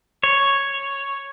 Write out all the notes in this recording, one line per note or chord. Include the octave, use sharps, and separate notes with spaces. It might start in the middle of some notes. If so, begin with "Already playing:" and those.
C#5